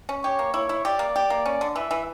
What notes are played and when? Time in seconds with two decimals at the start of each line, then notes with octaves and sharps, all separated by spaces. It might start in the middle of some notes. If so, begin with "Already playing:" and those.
0.09 C#4
0.23 G4 C#5
0.39 A#3
0.54 E4 C#5
0.69 E4
0.85 G4 D5
0.99 A#3
1.16 G4
1.30 A#3
1.46 C#4
1.61 D3
1.76 E3 E5
1.91 E3